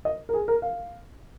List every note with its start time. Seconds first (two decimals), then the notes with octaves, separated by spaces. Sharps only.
0.05 D#5
0.29 A#4
0.34 G#4
0.48 A#4
0.62 F5